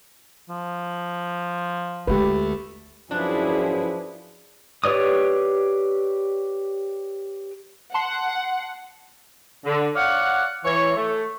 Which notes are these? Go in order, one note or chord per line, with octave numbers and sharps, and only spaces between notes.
F3
D2 G#3 A3 F4 G4 B4
F#2 F3 D4 E4 G#4 B4
G4 B4 C#5 D5 D#6
F#5 A5 C6 C7
D3
C#5 D5 F5 F#5
E3 C#5
A3